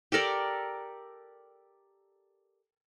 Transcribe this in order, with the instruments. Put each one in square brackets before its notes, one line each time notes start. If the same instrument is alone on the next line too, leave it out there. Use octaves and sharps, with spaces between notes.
[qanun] G4 A4 A#4 D5